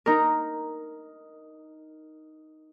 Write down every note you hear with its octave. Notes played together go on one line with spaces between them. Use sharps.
D#4 A#4